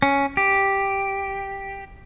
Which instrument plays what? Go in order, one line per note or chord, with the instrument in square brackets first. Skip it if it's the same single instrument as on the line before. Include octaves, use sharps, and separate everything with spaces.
[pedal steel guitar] C#4
G4